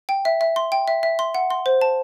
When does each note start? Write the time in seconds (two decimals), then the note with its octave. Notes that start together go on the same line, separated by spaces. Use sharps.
0.09 G5
0.25 E5
0.41 E5
0.56 C6
0.72 G5
0.88 E5
1.03 E5
1.19 C6
1.35 F#5
1.50 C6
1.66 C5
1.81 A5